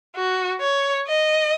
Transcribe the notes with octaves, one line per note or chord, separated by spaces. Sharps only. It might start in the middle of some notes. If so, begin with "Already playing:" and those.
F#4
C#5
D#5